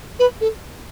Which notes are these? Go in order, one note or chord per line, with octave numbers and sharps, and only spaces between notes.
B4
A4